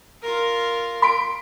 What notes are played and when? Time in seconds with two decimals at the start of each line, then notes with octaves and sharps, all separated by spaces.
0.23 F4 A#4
1.02 C6 B6 D7